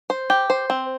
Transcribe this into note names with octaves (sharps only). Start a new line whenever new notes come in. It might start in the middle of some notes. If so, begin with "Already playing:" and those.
C5
G4
C5
C4